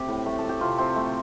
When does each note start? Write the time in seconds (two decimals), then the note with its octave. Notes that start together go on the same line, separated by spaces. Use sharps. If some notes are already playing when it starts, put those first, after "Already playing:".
Already playing: C3 A3 G4
0.09 A2
0.26 A3
0.39 A4
0.44 A3
0.49 G4
0.61 C3 F4
0.78 C3 C4
0.96 A3